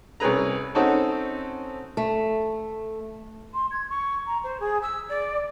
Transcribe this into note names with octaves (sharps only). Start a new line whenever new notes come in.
C2 C#4 G#4 B4 A#5
C4 C#4 D#4 F#4 A4
A3
C6
G#6
C#6
A#5
C5
G#4
E6
D5